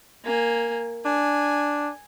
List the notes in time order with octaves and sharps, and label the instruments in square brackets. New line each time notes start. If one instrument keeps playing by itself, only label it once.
[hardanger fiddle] A#3 G#5
[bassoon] D4 [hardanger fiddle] G#5